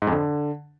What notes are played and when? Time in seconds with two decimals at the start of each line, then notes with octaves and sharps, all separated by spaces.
0.02 G#2
0.07 F2
0.12 D3